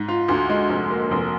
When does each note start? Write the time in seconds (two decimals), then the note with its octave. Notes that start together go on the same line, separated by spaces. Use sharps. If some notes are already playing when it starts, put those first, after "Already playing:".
Already playing: G#2
0.08 F4
0.29 D2
0.50 G#3
0.69 F1
0.90 A#3
1.11 F1